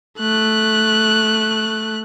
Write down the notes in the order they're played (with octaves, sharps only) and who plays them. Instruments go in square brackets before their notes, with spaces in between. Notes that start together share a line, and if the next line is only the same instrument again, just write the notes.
[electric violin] A3 F#6